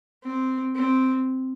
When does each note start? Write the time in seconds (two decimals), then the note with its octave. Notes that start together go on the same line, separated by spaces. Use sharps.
0.23 C4
0.75 C4